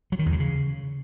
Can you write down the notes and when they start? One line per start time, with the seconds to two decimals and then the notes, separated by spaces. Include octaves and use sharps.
0.12 F#3
0.19 D#3
0.26 E2
0.33 D3
0.40 C#3